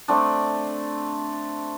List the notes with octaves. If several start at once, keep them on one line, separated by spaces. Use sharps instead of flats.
A3 C4 D4